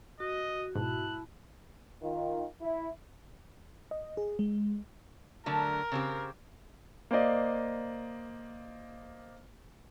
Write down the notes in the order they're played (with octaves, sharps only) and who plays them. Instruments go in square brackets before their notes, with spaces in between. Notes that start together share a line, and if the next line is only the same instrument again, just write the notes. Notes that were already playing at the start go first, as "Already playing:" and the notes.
[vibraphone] F#4 [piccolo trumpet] D#5
[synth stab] G#2 B2 [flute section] E4 A5 [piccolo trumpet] F#6
[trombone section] D#3 F4
E4
[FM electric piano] D#5
G#4
G#3
[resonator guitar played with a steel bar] D3 F#3 A3 [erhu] A#4
[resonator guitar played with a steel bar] C#3 C4 G4
[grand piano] A#3 C5 D5 D#5